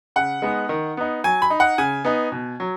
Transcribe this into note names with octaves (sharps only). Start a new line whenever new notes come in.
C#3 F#5
G#3 B3 D#4
D#3
B3 D#4
F#3 G#5
B5
D#4
F#5
C#3 G#5
B3 D#4
B2
F#3